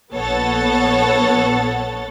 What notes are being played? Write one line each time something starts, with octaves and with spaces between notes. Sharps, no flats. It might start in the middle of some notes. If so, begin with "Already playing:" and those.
A#1 B3 A4 C#5 F#5 A6